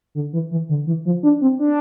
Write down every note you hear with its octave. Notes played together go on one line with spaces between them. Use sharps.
D3
E3
E3
D3
E3
F3
D4
C4
D4